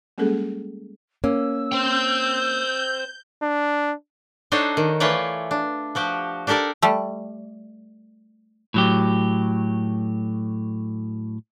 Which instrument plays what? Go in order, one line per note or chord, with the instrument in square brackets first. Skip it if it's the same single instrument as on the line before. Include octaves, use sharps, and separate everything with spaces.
[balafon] G3 G#3 A#3 C#4 G#4 A4
[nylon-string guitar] A#3 C#4 [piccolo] E6
[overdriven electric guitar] C5 G5 [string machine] G6
[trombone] D4
[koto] D4 D#4 F#4 A4 C5 C#5
D#3
E3 A3 F4 B4 C#5 D5
D4
F3 F#4 G4
D4 G4 A4 A#4 D5
G3 A3
[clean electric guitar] A2 F#3 G4